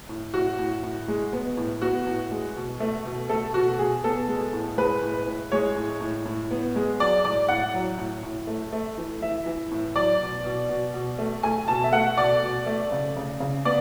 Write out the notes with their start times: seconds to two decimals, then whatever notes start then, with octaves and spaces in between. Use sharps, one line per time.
0.09 A2
0.34 A2 F#4
0.59 A2
0.83 A2
1.08 G#3
1.33 B3
1.57 A2
1.82 B3 F#4
2.07 A2
2.31 G#3
2.56 B2
2.80 A3
3.05 B2
3.29 A3 A4
3.54 B2 F#4
3.79 B2 G#4
4.04 B3 A4
4.28 G#3
4.53 A2
4.78 G#3 B4
5.02 A2
5.27 A2
5.52 G#3 C#5
5.76 A2
6.01 A2
6.25 A2
6.51 B3
6.76 G#3
7.00 F#3 D5
7.25 A2 D5
7.49 A2 F#5
7.74 F#3
7.98 A2
8.23 A2
8.47 A3
8.73 A3
8.98 E3
9.21 E3 E5
9.46 E3
9.71 A2
9.96 F#3 D5
10.21 B2
10.44 B2
10.69 B2
10.94 B2
11.19 A3
11.43 A3 G#5
11.68 B2 A5
11.84 E5
11.92 A3 F#5
12.17 B2 D5
12.43 B2
12.66 A3
12.92 C#3
13.17 C#3
13.40 C#3
13.65 B3 D5